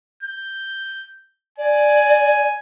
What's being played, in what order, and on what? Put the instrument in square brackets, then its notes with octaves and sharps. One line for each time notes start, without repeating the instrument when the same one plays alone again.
[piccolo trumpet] G6
[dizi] D5 [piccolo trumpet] G#5